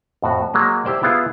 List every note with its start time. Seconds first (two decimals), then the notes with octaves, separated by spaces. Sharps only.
0.22 F2 A2 F#4
0.54 F#3 G#3 A#3
0.85 E4 G4 C5 D5
1.03 B3 E4 F4 G#4 F5